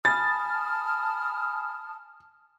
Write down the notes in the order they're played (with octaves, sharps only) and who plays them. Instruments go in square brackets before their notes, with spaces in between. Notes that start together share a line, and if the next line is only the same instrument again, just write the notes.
[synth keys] G#5 B5 [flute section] A5 D#6 F6 [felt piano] A6